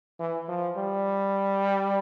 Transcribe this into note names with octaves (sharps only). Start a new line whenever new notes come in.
E3
F3
G3